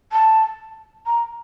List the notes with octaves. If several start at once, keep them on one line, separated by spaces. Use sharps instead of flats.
A5
A#5